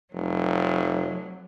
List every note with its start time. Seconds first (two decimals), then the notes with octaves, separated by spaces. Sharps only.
0.13 F1 F#3